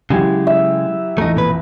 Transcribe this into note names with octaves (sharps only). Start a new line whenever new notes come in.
C#3 F#3 G#3 E4 G4
E5
A1 F2 A3 D#4 A#5
A#2 B4